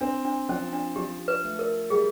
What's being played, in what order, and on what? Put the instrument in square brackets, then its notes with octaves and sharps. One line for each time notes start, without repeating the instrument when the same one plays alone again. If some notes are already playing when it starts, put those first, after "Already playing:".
[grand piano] C4 [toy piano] D4
[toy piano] D4
[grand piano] F3 [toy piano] C#4
[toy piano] D4
[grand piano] F3 [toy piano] G4
[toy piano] B4
[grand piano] A3
[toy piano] A#4
[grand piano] G3 [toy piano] G#4